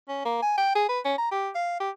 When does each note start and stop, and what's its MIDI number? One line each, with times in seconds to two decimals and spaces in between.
0.09 0.24 61
0.25 0.38 58
0.42 0.53 80
0.58 0.74 79
0.75 0.87 68
0.89 1.00 71
1.05 1.15 61
1.18 1.28 82
1.31 1.49 67
1.55 1.77 77
1.80 1.90 67